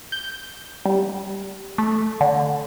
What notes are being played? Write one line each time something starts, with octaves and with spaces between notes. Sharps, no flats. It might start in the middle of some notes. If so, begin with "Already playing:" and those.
G6
G3
A3
D3